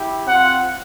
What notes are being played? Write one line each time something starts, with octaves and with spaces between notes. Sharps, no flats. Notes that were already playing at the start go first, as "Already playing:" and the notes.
Already playing: E4 G4
C4 F4 F#5